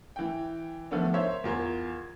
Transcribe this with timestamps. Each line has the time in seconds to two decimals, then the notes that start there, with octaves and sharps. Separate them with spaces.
0.16 E3 G5
0.91 D#3 F3 A3 B3 D4
1.14 A#4 C5 C#5 E5
1.44 E2 F4 A#4 G#6